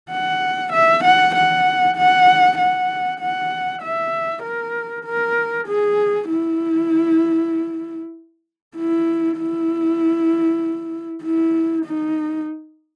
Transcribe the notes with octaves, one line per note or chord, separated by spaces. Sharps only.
F#5
E5
F#5
F#5
F#5
F#5
F#5
E5
A#4
A#4
G#4
E4
E4
E4
E4
D#4